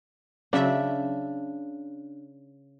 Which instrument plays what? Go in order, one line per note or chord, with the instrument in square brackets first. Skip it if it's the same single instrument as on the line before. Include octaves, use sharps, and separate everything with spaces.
[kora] C#3 D4 [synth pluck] F#3 C#4 E5